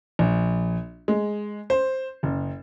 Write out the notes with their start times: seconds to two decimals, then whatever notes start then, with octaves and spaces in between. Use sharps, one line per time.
0.19 A#1
1.08 G#3
1.70 C5
2.23 F#1